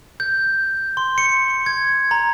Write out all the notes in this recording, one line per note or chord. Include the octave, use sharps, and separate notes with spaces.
G6
C6
C#7
G#6
A#5